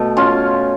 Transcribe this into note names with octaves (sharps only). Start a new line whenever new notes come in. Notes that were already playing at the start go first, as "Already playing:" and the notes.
Already playing: B2 A3
C#4 F4